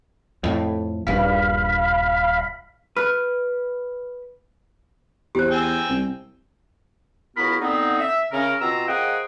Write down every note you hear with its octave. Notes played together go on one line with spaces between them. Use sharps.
F2 A2
D#1 A#1 G2 F5 B5
B4 F6
E2 G4 C5
G5 G#5 E6
C2
C#2 B3 E4 F#4 A#4 B5
D3 B3 C4 D#4
E5
C#3 C#4 A#4
B2 C4 F4 A#5 E6
A#3 G#4 C5 D#5 F#5 G5